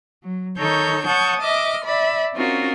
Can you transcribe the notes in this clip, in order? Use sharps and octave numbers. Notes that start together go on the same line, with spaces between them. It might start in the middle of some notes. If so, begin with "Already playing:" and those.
F#3
D#3 D#4 A4 C#5 C#6 G6
C#5 F#5 A5 C#6 D#6 G6
D#5 E5 D6 F6
D5 E5 B5
C4 C#4 D#4 F4 F#4 A#4